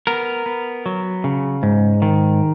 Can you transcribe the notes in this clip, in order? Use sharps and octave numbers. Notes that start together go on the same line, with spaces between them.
B3 A#4
B3
F#3
C#3
G#2
D#3